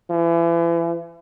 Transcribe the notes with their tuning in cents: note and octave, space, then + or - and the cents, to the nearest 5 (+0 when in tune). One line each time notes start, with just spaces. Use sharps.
E3 +35